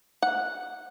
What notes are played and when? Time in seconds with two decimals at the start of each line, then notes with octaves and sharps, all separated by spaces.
0.22 F#5